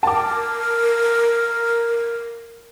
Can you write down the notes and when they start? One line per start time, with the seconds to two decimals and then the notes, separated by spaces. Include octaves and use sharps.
0.03 A#4 A5 D6